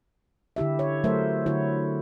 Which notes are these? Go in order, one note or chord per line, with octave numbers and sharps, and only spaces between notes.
D3 E4 G4 E5
C#5
F#3 A3 A#4 C5 E5
D3 E4 F#4 C#5